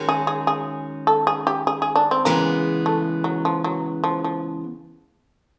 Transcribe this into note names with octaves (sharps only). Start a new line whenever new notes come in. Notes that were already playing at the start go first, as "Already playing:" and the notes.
Already playing: D#3 G#3 C#4 F#4
G#4
G#4
G#4
A4
G#4
G4
G#4
G#4
D4
C4
C#3 E3 G#3 A#3 B3
A3
F#3
F3
F#3
F3
F3